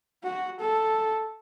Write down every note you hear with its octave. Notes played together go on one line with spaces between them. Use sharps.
F#4
A4